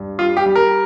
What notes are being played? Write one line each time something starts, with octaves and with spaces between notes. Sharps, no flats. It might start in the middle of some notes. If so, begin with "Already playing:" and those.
Already playing: G2
G3 F4
G4
G3
A#4